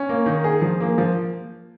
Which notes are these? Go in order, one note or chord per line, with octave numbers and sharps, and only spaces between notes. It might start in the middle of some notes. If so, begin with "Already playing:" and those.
Already playing: C#4
A#3
D#3
G#4
F3
A#3
F3